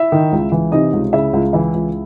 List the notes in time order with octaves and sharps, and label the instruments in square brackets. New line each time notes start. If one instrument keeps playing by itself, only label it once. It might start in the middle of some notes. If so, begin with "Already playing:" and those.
Already playing: [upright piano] E4 E5
D#3
C#2
E3
C3 D#4 D#5
C#2
C#3 E4 E5
C#2
E3 E4 E5
C#2